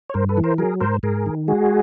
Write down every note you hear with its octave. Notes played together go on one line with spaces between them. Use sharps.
C#5
G2 A#4 C5
A4 B4
E3
A#4 C5
F#3 G#4 A#4
G#2 A#4 C5
G#2 G#4 A#4
D#3
G#3 F#4 G#4